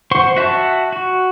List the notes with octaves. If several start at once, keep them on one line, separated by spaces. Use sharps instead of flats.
C5 F#5 C6 C#6
F#4 E5 F#5 A5
F#4